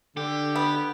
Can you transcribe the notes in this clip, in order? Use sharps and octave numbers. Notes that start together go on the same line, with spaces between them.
D3 G4
B3